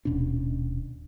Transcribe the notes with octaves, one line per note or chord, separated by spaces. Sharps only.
D#1 B2 C#4 D4